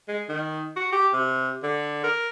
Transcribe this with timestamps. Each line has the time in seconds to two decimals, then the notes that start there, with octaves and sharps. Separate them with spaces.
0.08 G#3
0.29 D#3
0.76 F#4
0.92 G4
1.14 C3
1.63 D3
2.04 A#4